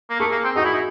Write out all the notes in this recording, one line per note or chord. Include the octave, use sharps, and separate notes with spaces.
A#3
A3 G#4 A#4
A#3
C4
D#4 F#4 G#4
E4
D#4